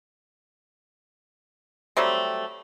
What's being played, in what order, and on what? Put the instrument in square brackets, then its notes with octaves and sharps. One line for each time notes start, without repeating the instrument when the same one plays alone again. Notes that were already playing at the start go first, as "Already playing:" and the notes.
[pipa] F#3 G3 A3 C4